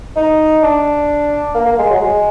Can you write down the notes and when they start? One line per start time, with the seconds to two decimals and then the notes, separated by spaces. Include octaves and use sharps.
0.16 D#4
0.63 D4
1.55 A#3
1.66 A#3
1.79 G#3
1.90 F#3
2.01 G#3